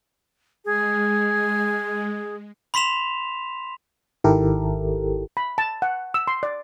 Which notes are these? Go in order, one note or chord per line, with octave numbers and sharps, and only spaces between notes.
G#3 G#4
B5 C6 B6 E7 F7
G#1 D#3 E4 G4 A4 A#4
B5
A5
F#5
E6
C6
D5